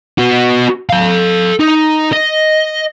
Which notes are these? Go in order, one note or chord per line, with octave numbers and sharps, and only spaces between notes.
B3 F#4
A4 F5
D#4
D#5